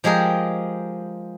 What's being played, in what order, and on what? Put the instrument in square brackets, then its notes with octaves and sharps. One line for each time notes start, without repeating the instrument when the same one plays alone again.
[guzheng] F3 G#3 G4 G#4 A#4